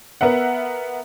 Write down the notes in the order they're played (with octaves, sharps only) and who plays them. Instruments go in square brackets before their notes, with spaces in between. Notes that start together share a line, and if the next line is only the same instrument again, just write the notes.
[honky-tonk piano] B3 A#4 E5 F#5